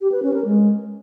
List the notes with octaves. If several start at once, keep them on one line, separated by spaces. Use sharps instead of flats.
G4
B4
C#4
A#4
G#3